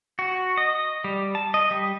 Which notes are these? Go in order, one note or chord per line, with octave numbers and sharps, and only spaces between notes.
F#4
D#5
G3
A5
D#5
G3